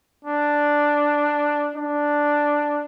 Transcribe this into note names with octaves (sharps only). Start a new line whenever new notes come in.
D4
D4